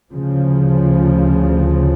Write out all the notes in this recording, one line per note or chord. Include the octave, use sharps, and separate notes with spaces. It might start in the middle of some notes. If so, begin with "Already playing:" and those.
D2 C#3 F3